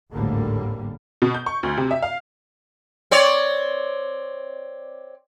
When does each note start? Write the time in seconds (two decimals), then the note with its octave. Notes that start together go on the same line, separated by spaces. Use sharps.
0.13 G#1 D2 A2 D3 G3 A#3
1.22 B2
1.34 G6
1.46 C#6
1.63 D2
1.77 C3
1.91 E5
2.02 F5
3.11 C4 C#5 D5